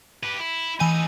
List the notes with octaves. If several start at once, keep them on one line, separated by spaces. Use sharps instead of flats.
G4 B4
E4
A2 E3 D#4 G#5 D#7